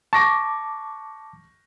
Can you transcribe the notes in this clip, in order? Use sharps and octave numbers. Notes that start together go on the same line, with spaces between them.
A5 C#6 D6 A#6